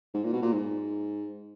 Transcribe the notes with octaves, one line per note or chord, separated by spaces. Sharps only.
G#2
A#2
B2
A#2
G#2